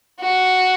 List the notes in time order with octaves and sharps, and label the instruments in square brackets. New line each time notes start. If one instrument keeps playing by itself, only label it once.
[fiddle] F#4